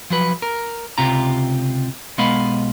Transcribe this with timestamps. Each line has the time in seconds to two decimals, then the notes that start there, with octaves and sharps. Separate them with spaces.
0.10 F3 F#3 B4
0.42 A#4
0.98 C#2 C3 F4 G4 A#5
2.18 B1 G#3 B3 D#5 F5 B5